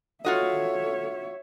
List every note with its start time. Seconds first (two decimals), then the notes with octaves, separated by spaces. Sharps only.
0.25 F4 F#4 A4 C#5 D#5 E5